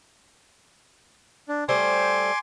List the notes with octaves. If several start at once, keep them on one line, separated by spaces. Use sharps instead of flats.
D4
G3 A3 C5 G#5 C6 D6